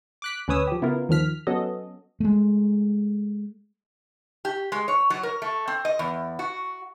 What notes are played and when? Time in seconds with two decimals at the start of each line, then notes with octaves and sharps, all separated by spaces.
0.22 D6 F#6 B6
0.48 D2 C#4 B4 C#5 D#6 E6
0.67 F3 G4
0.82 C#3 B3 E4 F4 A#4
1.09 D#2 D#3 F3 F6 B6
1.47 F#3 B3 C#4 F#4 A4 D#5
2.20 G#3 A3
4.45 G4
4.72 G#3
4.88 C#5
5.10 F#3
5.23 A#4
5.42 A3
5.68 C4
5.85 D#5
5.99 E2
6.39 F#4